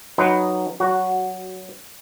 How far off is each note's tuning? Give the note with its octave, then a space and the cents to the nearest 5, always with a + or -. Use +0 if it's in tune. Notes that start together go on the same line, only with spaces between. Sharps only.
F#3 +0 D#4 +0 B4 +0
F#3 +15 F#4 +0